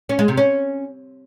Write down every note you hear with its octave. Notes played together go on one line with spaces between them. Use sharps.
C#4
G#3
C3
C#4